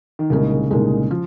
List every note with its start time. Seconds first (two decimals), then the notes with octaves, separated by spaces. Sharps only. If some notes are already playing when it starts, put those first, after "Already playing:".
0.19 D#3
0.30 C2 A#2 C#3 G#3 D#4 A#4
0.71 C2 A#2 G#3 D#4 A#4
1.10 F3 F4